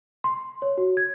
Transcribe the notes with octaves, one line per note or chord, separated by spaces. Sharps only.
C6
C#5
F#4
G#6